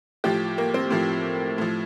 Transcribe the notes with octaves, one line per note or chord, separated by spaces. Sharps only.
A2 F3 G4
A#3
C4
A2 F3
A2 F3